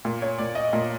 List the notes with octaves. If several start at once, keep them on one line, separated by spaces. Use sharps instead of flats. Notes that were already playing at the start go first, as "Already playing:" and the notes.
A#2
C#5
A#2 D5
D#5
A#2